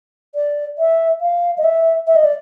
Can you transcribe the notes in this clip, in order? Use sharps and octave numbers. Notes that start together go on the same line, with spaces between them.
D5
E5
F5
D#5
E5
E5
D#5
D5